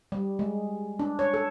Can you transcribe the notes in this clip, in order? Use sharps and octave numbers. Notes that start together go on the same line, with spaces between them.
G3
G#3
D4
C#5
A4